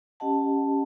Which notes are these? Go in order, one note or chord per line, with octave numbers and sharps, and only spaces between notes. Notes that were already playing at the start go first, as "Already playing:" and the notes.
C#4 G4 D#5 F#5 A5